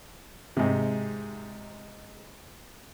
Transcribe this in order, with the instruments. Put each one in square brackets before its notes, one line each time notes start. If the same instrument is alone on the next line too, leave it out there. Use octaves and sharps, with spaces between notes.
[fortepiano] G#2 C3